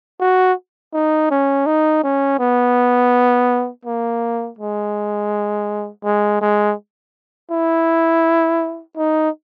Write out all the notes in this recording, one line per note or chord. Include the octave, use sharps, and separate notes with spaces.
F#4
D#4
C#4
D#4
C#4
B3
A#3
G#3
G#3
G#3
E4
D#4